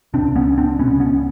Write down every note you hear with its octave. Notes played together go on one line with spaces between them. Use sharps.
C#2 B2 C4 D4
B3 C#4
C4 D4
C#2 B2 B3 C#4
B3 C#4